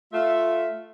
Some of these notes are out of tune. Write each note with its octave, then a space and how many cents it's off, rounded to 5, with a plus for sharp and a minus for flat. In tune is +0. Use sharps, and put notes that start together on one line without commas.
A3 +0 F4 +0 E5 +0